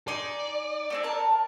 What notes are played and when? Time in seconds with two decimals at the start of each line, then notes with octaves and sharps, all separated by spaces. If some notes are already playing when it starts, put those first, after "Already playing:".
0.08 D#4 D5 G#5 C6
0.90 A3 C4 G#4
1.03 A#4 A5